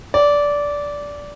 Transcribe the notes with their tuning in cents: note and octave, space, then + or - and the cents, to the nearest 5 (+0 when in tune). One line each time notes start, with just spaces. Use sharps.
D5 -15